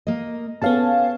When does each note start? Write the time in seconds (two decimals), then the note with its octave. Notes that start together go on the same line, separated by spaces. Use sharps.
0.07 A#3 D#5
0.62 B3 C#4 G#4 C#5 F5 A5